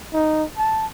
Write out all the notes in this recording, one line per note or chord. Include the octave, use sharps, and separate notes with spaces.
D#4
A5